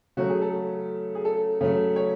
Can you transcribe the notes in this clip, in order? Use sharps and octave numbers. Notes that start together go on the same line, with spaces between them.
C#3 F#3 A3 F#4
G#4
A4
G#4
A4
C#3 F#3 A3
C#5